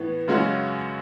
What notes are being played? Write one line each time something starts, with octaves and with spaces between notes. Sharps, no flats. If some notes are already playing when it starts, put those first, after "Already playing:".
Already playing: A2 E3 B3
F#2 C#3 G#3 C#4 F#4